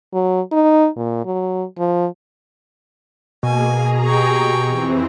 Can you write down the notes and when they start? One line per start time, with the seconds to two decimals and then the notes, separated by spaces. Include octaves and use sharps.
0.14 F#3
0.52 D#4
0.96 A#2
1.25 F#3
1.78 F3
3.43 B2 A#3 G#4 G#5
3.72 G#4 A#5
4.06 G4 G5 C#6
4.66 F2 E3 C4